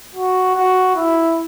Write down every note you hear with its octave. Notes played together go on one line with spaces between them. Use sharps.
F#4
F#4
E4